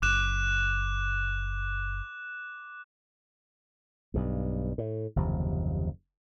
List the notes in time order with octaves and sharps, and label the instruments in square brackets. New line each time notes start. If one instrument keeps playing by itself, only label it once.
[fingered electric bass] F#1 [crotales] D6 F#6 E7
[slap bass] B1 G2
A2
F#1 D#2 C3 F3